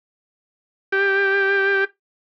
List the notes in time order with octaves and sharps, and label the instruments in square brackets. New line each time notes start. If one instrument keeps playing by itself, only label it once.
[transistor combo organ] G4